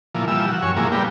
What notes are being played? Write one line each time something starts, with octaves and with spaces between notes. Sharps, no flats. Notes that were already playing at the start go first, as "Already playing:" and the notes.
A#2 E3 F3
E3 F3 G3 E6
F#4
F#2 C#5 G#5
A#2 F3 G#3 A#3 E4
G3 B3 D4 G4 A#4